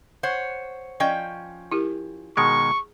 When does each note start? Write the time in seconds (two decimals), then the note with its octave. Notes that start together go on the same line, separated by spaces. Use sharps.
0.23 C5 C#5 F#5
1.00 F3 C#4 D5 D#5 G5 C#6
1.72 E4 G4 A#4
2.37 B2 D#3 G#3 G#4 C#6